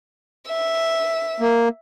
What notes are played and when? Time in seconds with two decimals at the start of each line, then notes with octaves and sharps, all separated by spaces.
0.48 E5
1.40 A#3